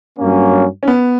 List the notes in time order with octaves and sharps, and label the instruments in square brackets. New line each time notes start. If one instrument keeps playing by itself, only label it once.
[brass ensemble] G2 F#3 A#3 C#4
[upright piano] C#4
B3